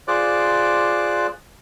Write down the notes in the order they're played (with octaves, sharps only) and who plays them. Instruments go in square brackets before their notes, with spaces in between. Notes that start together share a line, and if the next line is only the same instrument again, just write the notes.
[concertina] F4 G#4 C5 D5 D6 F#6